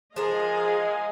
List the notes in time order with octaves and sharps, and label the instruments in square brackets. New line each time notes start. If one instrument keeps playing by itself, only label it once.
[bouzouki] F3 G#4 A#4 [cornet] G#3 [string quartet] D#5 F5 G#5